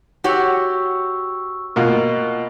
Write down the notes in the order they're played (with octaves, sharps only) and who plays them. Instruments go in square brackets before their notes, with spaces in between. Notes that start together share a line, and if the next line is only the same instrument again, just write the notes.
[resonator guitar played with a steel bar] F#4 G4 C#5 [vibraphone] C#6 E6
[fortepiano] B2 A#3 F4 [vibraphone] D#5